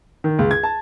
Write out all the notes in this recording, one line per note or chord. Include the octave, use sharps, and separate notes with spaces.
D#3
C#2
G#6
A5